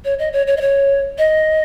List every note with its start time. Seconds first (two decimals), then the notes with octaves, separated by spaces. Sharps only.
0.05 C#5
0.19 D#5
0.33 C#5
0.47 C#5
0.57 D#5
0.61 C#5
1.18 D#5